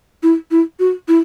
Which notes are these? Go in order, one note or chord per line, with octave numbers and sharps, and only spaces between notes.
E4
E4
F#4
E4